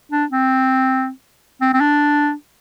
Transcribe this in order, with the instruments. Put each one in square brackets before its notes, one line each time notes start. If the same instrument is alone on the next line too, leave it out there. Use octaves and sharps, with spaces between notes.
[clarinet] D4
C4
C4
C4
D4